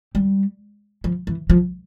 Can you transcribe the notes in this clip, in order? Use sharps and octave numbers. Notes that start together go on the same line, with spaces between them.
G3
F3
E3
F3